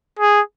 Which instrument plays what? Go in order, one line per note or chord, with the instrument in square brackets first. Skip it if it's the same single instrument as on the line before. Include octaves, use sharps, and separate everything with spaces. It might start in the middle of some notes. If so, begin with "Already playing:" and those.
[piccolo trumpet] G#4